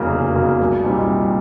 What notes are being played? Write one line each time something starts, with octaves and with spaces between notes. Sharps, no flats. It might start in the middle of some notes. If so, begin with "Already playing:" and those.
Already playing: F1 E2 C#3 F#3 A#3
F1
E2 C#3 F#3 A#3
C2
A#2 G3 C4 D#4
C2